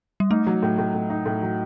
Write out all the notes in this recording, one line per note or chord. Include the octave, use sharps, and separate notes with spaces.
G3
A3 D#4
F#3
A2
A2
A2
D#4
A2
F#3